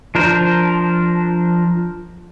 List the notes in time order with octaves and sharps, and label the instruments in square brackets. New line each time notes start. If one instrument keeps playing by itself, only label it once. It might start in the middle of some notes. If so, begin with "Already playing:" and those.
[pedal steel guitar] F3 D4 A#4 C5